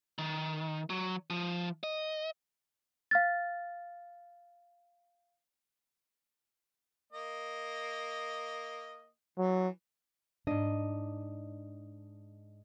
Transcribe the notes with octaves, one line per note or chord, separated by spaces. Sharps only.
D#3
F#3
F3
D#5
F5 F6 A6
A#3 D#5
E3 F#3
G#2 D4 D#5